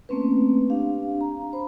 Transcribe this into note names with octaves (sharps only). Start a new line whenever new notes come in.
A3 A#3 C4 C#4 B4
D4 G4 F5
A#5
C5 B5